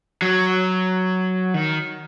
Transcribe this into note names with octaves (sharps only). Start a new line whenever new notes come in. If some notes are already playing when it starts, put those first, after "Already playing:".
F#3
D#3